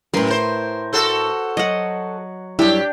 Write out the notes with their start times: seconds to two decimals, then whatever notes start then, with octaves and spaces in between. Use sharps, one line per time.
0.14 F#2 A2 A#4 B4 C6
0.30 C5
0.93 F#4 A4 C5
1.57 F#3 D#5 F#5
2.59 G2 F#3 D4 E4 G4